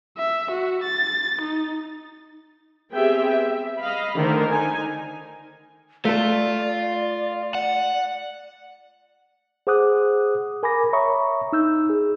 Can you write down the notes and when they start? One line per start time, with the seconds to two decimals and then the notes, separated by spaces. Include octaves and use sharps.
0.17 E5
0.51 F#4
0.83 A6
1.42 D#4
2.92 B3 C4 G4 G#4 E5 G5
3.29 E5
3.79 D#5 F5 B5
4.16 D3 D#3 A3 A#4 C5
4.48 D#4 G#5
6.05 A3 F4 A4 D5
7.55 F#5
9.67 G#4 C5 F#5 D6 D#6 F#6
10.63 A#4 G#5 B5 D6 A#6
10.93 C#5 E5 A#5 B5 C#6 D#6
11.53 D#4 E6 G6
11.90 G#4